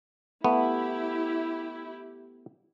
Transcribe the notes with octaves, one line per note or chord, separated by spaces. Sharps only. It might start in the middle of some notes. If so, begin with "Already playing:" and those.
A3 B3 E4 G4